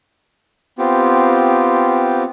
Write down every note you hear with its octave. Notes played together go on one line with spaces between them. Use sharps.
B3 C4 F4 G4